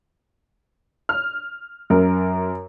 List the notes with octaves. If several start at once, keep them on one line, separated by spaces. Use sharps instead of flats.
F6
F#2 A#4